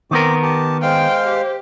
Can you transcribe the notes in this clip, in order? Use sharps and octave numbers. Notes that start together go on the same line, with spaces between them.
D#3 B3 C4 A#4 D6
G4 A5
G#3 C5 F5 G5 F6
G4